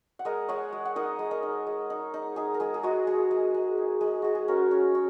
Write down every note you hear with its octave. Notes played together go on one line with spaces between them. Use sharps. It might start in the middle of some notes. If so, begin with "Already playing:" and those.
F#5
G#3 A#4 D#5
G#3 C#5 F#5
G#3
F#5
D#4 A#4 D#5
G#3
A#4 D#5
D#4
G#3
D#4
D#4
D#4 G#4
A#4
G#3 G#4
G#4
G#3 F#4
G#3 G#4
G#3
G#3
D#4
G#3
G#3 F#4
G#4
C#4 F#4 A#4
C#4
C#4